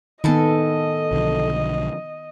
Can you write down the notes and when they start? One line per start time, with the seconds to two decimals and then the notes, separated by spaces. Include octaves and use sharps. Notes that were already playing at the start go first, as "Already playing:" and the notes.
0.24 A2 D#3 B3 A4 D#5 G#5
1.12 B1 D3 F3